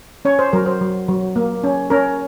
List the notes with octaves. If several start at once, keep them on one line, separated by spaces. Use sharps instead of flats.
C#4 C#5
C5
F#3 A#4
C5
F#3
F#3
A#3
C#4
C#4 A#4